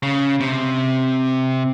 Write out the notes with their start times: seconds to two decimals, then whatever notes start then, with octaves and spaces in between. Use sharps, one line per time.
0.03 C#3
0.40 C3